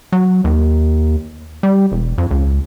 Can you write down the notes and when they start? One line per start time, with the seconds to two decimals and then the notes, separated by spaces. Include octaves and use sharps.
0.12 F#3
0.44 D#2
1.63 G3
1.92 E1
2.18 F2
2.31 C#2